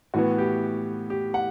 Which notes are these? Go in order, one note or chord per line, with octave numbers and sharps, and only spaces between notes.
A2 E3 B3 F#4
G4
G4
F#5